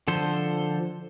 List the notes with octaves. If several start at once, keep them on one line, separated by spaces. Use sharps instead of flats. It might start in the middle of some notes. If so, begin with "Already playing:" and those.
D3 F3 A4 C5